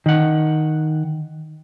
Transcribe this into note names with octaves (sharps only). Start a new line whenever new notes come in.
D#3 F#5